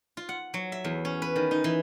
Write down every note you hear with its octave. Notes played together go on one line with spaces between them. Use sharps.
F4
F#5
F#3
E5
E2
C#4
B4
D#3
D#4
E3